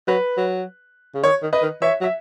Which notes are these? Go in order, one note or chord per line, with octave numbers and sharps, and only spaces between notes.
F#3 B4
F#3
C#3
D#3 C#5
D#3
B4 D#5
D#3
E3 C#5 E5
F#3
E5